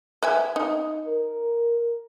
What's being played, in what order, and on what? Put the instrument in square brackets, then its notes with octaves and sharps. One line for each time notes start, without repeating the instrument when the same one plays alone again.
[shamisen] B4 E5 G#5
D#4
[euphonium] A#4